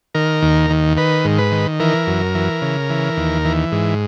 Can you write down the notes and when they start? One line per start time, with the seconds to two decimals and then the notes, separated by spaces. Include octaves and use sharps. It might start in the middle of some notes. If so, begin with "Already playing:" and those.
0.15 D#3 A#4
0.42 D#2
0.70 D#3
0.97 D#3 B4
1.25 G#2
1.39 B4
1.52 D#3
1.80 E3 A#4
2.07 F#2
2.35 E3
2.62 C#3
2.90 E3
3.17 D#2
3.45 E3
3.72 G#2